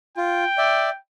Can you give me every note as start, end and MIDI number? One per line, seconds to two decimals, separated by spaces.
0.17 0.44 65
0.17 0.98 79
0.58 0.89 74
0.58 0.89 76